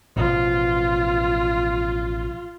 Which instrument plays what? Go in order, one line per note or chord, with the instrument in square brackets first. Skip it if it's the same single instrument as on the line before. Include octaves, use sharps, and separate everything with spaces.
[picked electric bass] A1 B2 F3 [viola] F4